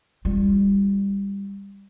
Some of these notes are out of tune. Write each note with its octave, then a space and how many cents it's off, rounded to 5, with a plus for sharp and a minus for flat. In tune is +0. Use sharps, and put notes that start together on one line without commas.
G3 +20 F4 +0